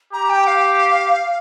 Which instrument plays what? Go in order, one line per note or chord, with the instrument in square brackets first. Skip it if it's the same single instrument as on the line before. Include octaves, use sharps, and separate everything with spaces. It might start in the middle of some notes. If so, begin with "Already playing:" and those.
[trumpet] G4 [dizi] A#5
[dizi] G5
F5